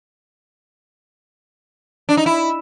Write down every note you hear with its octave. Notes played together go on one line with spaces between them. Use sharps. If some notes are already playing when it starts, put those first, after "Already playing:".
D4
D#4
E4